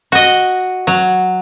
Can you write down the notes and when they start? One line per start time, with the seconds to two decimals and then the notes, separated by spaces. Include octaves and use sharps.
0.12 F#4 D#5
0.87 F#3